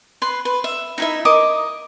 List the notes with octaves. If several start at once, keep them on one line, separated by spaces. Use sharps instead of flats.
B4 C6
B4
E5
D#4 E4 E5
A#4 D#5 D6 D#6